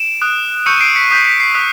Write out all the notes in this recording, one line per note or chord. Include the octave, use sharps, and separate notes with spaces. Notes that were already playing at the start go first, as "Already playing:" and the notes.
Already playing: D7 E7
D#6 F#6
C#6 E6 G6 C#7 D#7
D#7
C7 D7
B6 C#7
D#6 G6 B6
B6
C7
D#6 F#6 B6